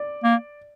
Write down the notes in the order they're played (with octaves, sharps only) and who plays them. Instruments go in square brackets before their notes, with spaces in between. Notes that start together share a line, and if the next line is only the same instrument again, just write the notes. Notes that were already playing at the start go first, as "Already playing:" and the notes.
Already playing: [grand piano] D5
[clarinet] A#3